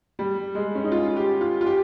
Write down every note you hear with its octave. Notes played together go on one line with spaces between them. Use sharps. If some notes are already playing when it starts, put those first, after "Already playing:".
G3
G#3
C#4
D#4
F4
G4
F4
F4
G4